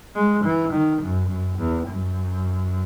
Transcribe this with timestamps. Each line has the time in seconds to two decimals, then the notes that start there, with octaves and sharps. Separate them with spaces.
0.15 G#3
0.44 E3
0.72 D#3
1.01 F#2
1.29 F#2
1.58 E2
1.87 F#2